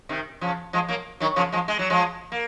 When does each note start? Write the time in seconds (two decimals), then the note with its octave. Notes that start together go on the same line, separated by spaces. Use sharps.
0.09 C3 D#3
0.41 C#3 F3
0.73 F3 G#3
0.88 F#3 A#3
1.20 D#3 F#3
1.36 C#3 F3
1.52 F3 G#3
1.68 G#3
1.79 F#3
1.90 F3 G#3
2.32 A#3